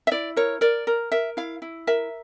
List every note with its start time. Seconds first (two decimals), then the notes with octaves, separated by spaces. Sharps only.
0.07 E5
0.11 E4 D5
0.36 A#4 C#5
0.61 A#4 D5
0.87 A#4
1.12 A#4 E5
1.37 E4 F5
1.62 E4
1.87 A#4 E5